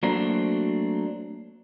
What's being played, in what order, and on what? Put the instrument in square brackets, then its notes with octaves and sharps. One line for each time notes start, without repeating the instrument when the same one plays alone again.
[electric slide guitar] F#3 A3 A#3 C4 D4 F#4